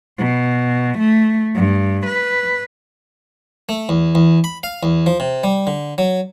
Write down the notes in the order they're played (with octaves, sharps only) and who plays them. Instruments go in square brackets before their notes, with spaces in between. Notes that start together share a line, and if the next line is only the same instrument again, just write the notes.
[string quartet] B2
A3
G2
B4
[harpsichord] A3
E2
E2
B5
F5
E2
F3
C3
G3
D3
F#3